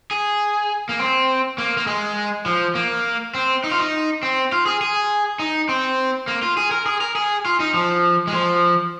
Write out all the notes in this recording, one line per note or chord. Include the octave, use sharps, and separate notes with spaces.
G#4
A#3
C4
A#3
A#3
G#3
F3
A#3
C4
D#4
F4
D#4
C4
F4
G#4
G#4
D#4
C4
A#3
F4
G#4
A#4
G#4
A#4
G#4
F4
D#4
F3
G#3
F3